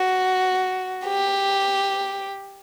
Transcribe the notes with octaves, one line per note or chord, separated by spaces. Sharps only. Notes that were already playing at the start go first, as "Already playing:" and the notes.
Already playing: F#4
G4